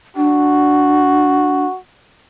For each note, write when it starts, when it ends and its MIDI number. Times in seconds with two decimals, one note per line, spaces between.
0.17 1.64 62
0.17 1.78 66